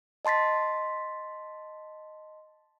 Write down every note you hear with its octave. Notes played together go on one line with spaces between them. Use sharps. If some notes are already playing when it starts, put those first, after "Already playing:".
D#5 A5 C6 A6 B6